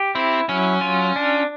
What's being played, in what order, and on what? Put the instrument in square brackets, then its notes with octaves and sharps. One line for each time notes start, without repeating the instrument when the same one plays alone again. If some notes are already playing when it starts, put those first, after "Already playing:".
Already playing: [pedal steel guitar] G4
[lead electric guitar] C4 [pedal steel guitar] E4
[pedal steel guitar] F#3 [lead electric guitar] C#4
[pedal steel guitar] F4
D4